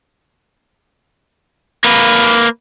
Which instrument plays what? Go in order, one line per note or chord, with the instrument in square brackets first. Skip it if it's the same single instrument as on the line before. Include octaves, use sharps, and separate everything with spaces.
[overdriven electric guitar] A#3 B4